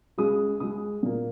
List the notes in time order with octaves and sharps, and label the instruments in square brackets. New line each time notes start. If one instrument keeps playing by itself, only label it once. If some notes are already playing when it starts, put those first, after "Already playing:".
[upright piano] C#2 C#3 G#3 D#6
C#2 C#3 G#3 D#6
A#2 A#3